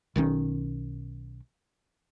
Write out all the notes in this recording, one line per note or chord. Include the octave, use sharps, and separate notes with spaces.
B1 D#3 F#3 C#4